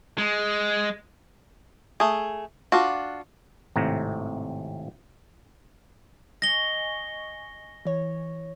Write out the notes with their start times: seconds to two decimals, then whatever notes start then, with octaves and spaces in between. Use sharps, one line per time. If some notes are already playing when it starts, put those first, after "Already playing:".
0.18 G#3
2.00 A3 G#4
2.72 D4 F4 F#4
3.76 G#1 A2 C3 A#5
6.42 D#5 G#5 C#6 A#6 G7
7.85 E3 C#5